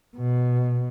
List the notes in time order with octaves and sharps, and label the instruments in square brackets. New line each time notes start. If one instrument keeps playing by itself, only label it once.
[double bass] B2